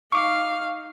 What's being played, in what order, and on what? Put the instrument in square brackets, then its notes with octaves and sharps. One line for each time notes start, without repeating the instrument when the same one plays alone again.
[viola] D#4 F5 [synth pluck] C#6 D6